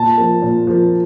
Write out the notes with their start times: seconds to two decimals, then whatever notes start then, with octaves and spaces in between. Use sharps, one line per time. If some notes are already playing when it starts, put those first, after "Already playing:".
Already playing: A#2 A5
0.18 F3 A#3
0.42 A#2
0.67 F3 A#3